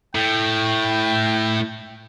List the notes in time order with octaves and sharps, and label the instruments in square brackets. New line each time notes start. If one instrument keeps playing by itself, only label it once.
[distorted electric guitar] A2 [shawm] G5